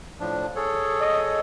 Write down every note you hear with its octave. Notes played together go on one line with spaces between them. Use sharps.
A2 F3 D4
G#4 A4 C#5
D#5